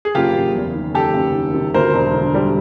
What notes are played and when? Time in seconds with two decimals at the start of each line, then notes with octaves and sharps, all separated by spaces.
0.05 G#4
0.15 F#1 F4 G4
0.35 F#1
0.55 E2
0.74 D#3
0.95 F#1 G4 A4
1.14 F#1
1.34 D#3
1.54 C3
1.74 D2 A#4 C5
1.93 E1
2.14 D3
2.34 G3